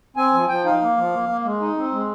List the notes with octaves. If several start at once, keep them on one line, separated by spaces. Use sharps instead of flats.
C4 G#5
F3
F3 G5
D#4 F5
A#3
F3
A#3
A#3
G#3
D#4
C4
G#3